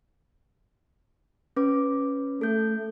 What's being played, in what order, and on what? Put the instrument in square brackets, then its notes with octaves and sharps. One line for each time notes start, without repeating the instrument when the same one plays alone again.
[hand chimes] C#4 B4 D6
[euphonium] A3 [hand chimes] A4 G6